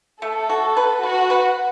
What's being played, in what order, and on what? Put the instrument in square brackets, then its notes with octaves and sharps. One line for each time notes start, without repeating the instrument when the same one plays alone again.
[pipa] A3 [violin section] A4
[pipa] F#4
B4
[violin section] F#4 [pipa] B4
[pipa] B4